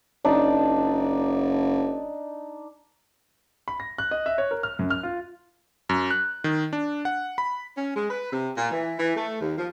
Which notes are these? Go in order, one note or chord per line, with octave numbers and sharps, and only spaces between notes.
F#1 D4 D#4
B5
A#6
F#6
D#5
E5
C#5
A#4
F6
F#2
F6
F4
F#2
F#6
D#3
D4
F#5
B5
C#4
G#3
B4
C3
A#2
E3
E3
A3
D#2
F3